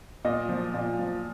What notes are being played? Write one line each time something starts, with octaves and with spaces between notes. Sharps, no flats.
A#2 D#5
F3
A#2
F3